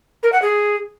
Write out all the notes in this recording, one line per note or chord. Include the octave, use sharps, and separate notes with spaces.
A#4
F#5
G#4